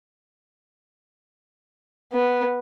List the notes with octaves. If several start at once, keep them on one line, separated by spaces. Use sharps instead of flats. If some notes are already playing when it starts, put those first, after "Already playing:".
B3